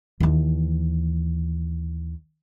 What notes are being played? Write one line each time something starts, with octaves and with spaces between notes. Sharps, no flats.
D#2 E3